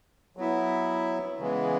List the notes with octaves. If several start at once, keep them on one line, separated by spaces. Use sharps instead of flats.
F#3 B3 E4
C#3 E3 G#3 B3